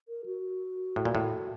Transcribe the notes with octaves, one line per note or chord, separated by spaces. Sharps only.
A#4
F#4
A2
A#2
A2